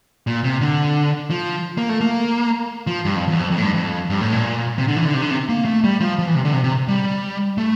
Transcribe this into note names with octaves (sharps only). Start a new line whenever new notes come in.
A#2
C3
D3
F3
A#3
A3
A#3
F3
G2
F2
E2
F2
F2
A2
G2
F2
G2
A2
A#2
C3
D3
E3
D3
C3
D3
C3
A#3
A3
G3
F3
F3
E3
C3
D3
C3
C3
G3
A3